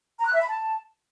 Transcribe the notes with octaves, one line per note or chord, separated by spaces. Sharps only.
A#5
F#6
E5
B5
A5